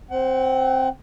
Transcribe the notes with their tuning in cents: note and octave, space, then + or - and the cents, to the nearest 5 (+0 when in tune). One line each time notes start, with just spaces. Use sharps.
C4 +5 F#5 +30